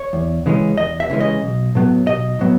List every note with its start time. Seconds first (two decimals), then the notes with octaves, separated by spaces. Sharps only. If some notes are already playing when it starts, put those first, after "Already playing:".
Already playing: C#5
0.13 E2
0.46 C#3 E3 G#3 C#4
0.77 E2 D#5
1.00 E5
1.10 C#3 E3 G#3 C#4
1.20 D#5
1.42 B1
1.75 A2 F#3 B3
2.07 B1 D#5
2.39 A2 F#3 B3